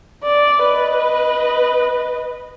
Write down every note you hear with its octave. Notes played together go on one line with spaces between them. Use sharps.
D5
B4 D#5